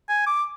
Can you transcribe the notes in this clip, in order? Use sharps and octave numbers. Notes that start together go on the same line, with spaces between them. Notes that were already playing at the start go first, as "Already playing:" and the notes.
G#5
D6